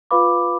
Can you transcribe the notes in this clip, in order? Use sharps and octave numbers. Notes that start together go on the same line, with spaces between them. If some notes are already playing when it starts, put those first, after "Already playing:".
F4 B4 F5 B5 D6